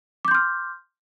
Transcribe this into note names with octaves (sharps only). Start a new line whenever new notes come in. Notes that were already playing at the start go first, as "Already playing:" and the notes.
C6 D6 F6 G6